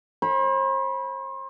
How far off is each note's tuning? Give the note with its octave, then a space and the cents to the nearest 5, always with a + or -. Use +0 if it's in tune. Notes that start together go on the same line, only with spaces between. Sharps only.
C5 +40 B5 -25